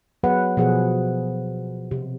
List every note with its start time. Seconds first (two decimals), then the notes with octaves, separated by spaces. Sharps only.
0.23 F#3 B3 G#4 B4 F#5
0.57 B2 F3 G#4 A4 F#5
1.91 C3